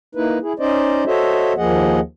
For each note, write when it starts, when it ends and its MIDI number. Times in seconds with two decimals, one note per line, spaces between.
0.15 0.38 58
0.15 0.38 63
0.15 0.38 64
0.15 0.38 71
0.42 0.53 64
0.42 0.53 68
0.59 1.04 61
0.59 1.04 63
0.59 1.04 72
0.59 1.04 74
0.59 1.04 75
1.06 1.53 66
1.06 1.53 69
1.06 1.53 72
1.06 1.53 73
1.06 1.53 75
1.06 1.53 76
1.57 2.00 39
1.57 2.00 53
1.57 2.00 58
1.57 2.00 68
1.57 2.00 75
1.57 2.00 78